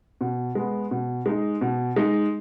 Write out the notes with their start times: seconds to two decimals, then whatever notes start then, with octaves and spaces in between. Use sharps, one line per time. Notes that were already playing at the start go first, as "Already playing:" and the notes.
0.21 B2
0.55 G#3 B3
0.91 B2
1.26 G#3 D#4
1.61 B2
1.96 G#3 D#4